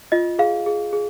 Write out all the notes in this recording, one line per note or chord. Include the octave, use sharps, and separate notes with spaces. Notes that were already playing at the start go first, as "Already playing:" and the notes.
F4 D#5
G#4 F5
G#4
G#4